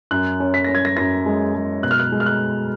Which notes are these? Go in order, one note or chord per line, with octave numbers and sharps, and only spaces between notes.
F#2 F#6
C#4
B6
C#4 A#6
G#6
A#6
F#2 A#6
G#3
G#3
B2 F#6
F6
F#6
G#3
F6
F#6